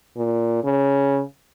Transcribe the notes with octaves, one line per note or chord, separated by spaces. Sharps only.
A#2
C#3